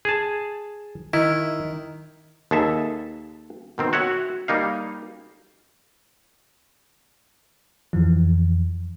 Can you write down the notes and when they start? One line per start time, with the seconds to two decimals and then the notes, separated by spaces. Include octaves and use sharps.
0.05 G#4 A5
1.13 D#3 E4
2.51 D#2 G#4 A4 E5 A5
3.78 B2 D#3 C4
3.93 F#4 C#5 E5 F#5
4.48 G3 A#3 D#4 F5
7.93 F2 E3 F3